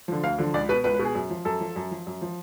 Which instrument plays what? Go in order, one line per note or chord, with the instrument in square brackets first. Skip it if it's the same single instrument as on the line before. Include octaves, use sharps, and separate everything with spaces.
[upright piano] D3 F3
D2 F5
D3 F3
C#2 D5
B2 B4
C#2 B4
B4
B2
G#4
F#2
F3
F#2 A4
F3
F#2
F3
F#2
F3